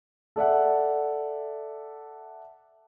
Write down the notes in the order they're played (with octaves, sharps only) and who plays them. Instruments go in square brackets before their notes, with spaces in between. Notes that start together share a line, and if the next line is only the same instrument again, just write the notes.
[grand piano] A4 D5 E5 F#5